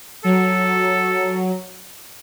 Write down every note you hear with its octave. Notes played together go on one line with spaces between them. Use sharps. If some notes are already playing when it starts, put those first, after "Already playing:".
F#3 A4